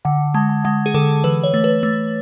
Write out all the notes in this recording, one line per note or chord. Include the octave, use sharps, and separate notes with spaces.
D3 F#5
G#3 A5
A5
G#3 F#5
G#4
D3 A4
E3 B4
C#5
A3
B4
A3